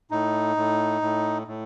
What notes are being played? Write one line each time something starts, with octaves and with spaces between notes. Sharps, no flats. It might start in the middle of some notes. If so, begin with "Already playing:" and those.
A2 D#4
A2
A2
A2